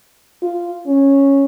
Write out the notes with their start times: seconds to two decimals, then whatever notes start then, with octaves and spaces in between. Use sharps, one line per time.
0.42 F4
0.87 C#4